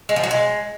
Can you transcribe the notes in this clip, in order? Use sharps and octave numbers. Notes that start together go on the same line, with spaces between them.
G#3
F3
F#3
G#3